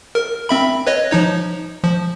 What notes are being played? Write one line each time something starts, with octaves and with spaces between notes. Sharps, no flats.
A#4
C4 E5 B5
B4 C#5 D#5
F3 D#4 C#5
F3